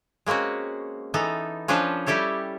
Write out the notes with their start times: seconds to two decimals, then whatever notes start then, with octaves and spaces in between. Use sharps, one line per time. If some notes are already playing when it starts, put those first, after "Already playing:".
0.26 G#3 A#3 C4 C#4 F#4
1.14 E3 B3 D#4 A4
1.68 F3 C#4 D4 B4 C5
2.06 G3 E4 G4 A4 C#5